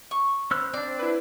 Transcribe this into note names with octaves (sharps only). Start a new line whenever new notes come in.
C#6
B3 C#4 C5 E6 F#6
C4 D4 D5
E4 B4